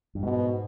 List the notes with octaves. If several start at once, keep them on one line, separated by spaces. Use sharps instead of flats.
G2
G#2 B2